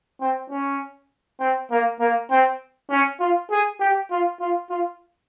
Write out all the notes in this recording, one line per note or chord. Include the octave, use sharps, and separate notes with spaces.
C4
C#4
C4
A#3
A#3
C4
C#4
F4
G#4
G4
F4
F4
F4